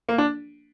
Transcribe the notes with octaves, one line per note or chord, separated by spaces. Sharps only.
A#3
D4